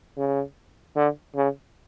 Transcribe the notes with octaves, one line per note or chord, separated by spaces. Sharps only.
C#3
D3
C#3